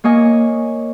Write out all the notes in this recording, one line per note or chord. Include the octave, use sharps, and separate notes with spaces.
A#3 C#5 D#5 G#5